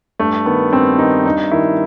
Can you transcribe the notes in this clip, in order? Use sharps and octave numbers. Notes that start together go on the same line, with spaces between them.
G2 A3
D#3 B3
G2 C4
D#3 D#4
G2 D#4
D#3 E4